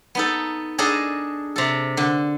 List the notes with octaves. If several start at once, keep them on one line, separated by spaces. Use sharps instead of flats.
B3 D#4 A4
D4 G#4 A4 D#5 A#5
C3 A4
D3